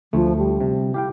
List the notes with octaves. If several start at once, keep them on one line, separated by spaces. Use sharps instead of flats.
D2 F3 A3
G3
C3
E4 G4 F5 G5